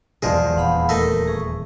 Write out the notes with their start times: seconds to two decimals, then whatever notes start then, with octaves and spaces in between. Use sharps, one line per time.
0.22 B1 E2 G#2 B2 F3 G#3 D5
0.56 D#1 F5 F#5 B5
0.89 A3 D#4 A#4
1.28 G#4 C#6